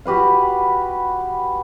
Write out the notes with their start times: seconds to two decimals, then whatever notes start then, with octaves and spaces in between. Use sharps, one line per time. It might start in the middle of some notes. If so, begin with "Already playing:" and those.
0.05 F#4 G4 B4 F5